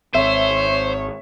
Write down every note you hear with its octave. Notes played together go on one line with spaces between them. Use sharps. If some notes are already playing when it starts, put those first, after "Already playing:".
G#1 C4 C5 C#5 E5